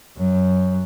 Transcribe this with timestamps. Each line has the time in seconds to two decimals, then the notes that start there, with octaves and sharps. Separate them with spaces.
0.17 F#2 F#3